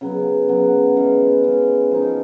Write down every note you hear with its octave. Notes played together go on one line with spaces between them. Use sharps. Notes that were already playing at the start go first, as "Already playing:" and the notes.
C#3 F#3 B3
C#3 F#3 B3
E3 G#3 C#4
E3 G#3 C#4
F3 A#3 D#4